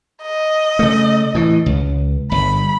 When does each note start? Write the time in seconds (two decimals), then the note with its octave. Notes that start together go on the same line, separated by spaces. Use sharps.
0.22 D#5
0.79 C#3 A3
1.35 A2 E3
1.66 C#2
2.32 G1 B5